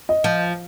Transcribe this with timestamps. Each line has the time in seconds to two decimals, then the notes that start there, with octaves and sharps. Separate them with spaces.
0.09 D#5
0.24 F3